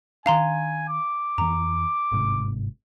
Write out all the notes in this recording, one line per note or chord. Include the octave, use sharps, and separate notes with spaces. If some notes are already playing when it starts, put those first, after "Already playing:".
D#3 D4 F5 G#5 A#5 C6
D6
F2 E3 A#5
G1 G#2 C3